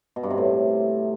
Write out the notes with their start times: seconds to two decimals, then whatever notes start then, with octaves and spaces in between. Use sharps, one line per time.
0.16 B2
0.23 G2
0.30 C3
0.38 A2